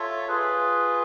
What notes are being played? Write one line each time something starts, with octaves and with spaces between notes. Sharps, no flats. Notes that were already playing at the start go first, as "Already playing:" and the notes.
Already playing: F4 A4 C#5 E5
F4 G#4 B4